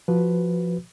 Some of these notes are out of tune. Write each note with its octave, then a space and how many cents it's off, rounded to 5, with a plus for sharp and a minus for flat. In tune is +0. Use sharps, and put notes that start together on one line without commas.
F3 +0 F#4 +0 B4 +0